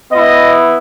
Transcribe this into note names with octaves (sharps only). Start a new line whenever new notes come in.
B3 E4 D#5